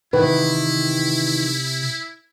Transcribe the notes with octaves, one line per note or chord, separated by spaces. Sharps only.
C3 D#3 E3 E4 B4